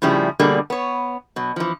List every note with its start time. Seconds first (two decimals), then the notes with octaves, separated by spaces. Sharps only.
0.02 A2 C#3 F3 G3 E4 G#4
0.39 B2 D3 G3 A#3 G#4 D5
0.70 B3 C#5
1.36 B2 F#3
1.56 E3 F3